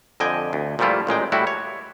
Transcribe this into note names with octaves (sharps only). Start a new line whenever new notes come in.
F2 D3 D#5 G5 G#5
D2
A#2 F3 G3 A3 E4 F4
A1 A#2 G#3 G5
A2 G3 E4 F#4
C#5